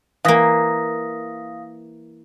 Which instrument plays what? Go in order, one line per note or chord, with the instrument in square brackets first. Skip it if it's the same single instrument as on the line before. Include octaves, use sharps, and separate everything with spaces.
[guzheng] E3 A#3 [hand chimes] F5 D#6 A#6